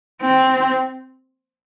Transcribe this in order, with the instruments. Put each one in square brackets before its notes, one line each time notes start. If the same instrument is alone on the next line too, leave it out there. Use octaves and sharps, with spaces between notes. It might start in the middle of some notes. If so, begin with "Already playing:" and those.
[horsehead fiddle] C4